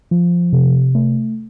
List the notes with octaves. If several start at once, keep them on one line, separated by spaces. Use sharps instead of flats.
F3
C3
A3